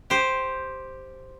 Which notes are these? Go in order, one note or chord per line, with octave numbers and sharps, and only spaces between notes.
G4 C5